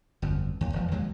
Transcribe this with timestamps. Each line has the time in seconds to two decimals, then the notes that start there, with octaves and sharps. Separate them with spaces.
0.22 G1 F2
0.61 D#2
0.73 E1 F3
0.92 D#2 F#3 G#3